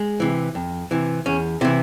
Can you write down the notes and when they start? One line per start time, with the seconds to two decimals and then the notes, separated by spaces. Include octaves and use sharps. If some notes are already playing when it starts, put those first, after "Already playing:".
Already playing: G#3
0.20 C3 E3
0.55 F2
0.91 C3 E3
1.26 E2 C#4
1.61 C3 E3 E4